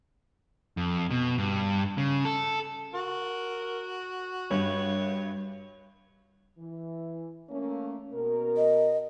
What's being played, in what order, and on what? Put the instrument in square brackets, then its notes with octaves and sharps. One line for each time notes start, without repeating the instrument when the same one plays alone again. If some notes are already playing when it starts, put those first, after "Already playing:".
[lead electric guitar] F2
B2
G2
C#3
A4
[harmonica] F#4 [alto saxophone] A#4
[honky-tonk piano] G2 [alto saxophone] C#5
[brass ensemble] E3
A3 A#3 C#4
B2 A#4
[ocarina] D#5